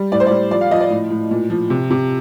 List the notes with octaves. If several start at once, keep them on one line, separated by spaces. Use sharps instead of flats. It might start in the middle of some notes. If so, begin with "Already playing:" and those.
Already playing: G3
A2 D5
C5
G3 D5
F3 D5
F5
F3 D#5
D5
A2
A2
A#2
F3
C3
C3